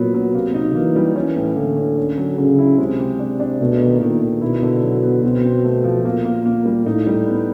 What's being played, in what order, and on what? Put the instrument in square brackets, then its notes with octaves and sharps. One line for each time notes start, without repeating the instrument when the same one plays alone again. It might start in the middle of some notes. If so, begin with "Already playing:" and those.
Already playing: [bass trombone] A#2 [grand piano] F#3 B3 F#4
[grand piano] F#3
[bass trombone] C3 [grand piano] A#3
[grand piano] D#4
[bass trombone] E3 [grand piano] A#3
[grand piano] G3
[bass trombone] E3 [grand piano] C#4
[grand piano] A2
[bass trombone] D3 [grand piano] A#3
[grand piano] C#4
C#4
F#3
[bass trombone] C#3 [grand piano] F#3
[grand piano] E4
[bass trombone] C3 [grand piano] G#3
[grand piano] G4
D4
D4
[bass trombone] B2 [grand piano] A3
[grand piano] D#3
[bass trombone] A#2 [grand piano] D#3
[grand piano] D#3
[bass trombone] B2 [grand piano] E4
[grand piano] D3
F#3
B3
[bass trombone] B2 [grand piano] C4
[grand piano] C4
A3
F3
[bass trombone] A#2 [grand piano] A#3
[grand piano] A#3
A#3
G3
[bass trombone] A2 [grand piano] D#4
[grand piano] G3
B3